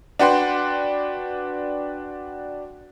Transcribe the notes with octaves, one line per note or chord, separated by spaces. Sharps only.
D4 F#4 B4 F#5 G5 C6